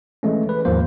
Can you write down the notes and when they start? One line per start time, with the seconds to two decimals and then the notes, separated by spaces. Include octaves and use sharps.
0.23 E3 G#3 A3 C#4
0.49 B4
0.65 D#2 G#2 F3 A#3 C5